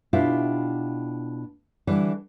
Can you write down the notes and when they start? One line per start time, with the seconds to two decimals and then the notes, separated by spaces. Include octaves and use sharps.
0.13 B2 D4 E4 F4 G4 E5
1.87 D3 E3 G3